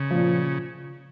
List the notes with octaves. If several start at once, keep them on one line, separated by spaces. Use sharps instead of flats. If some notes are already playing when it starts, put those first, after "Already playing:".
Already playing: C#3
A#2 F3